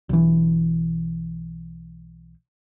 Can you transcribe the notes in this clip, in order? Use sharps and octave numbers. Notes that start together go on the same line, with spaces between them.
B1 E3